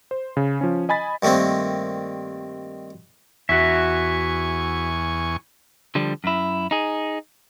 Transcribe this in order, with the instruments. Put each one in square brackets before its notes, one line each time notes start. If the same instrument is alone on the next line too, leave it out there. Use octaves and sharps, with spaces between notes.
[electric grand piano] C5
C#3
F3 C#4
D#5 G#5 B5 A6 B6
[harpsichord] G2 D#3 A3 A#3 C4
[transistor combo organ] E2 G#5 C#6 [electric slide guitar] F#4 E5
[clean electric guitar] D3 F3 G3
F#2 E4
D#4 G#4